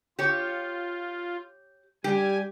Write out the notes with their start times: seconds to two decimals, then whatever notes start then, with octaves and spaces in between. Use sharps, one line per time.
0.19 F4 G4 C#5
2.04 G3 G4 G#5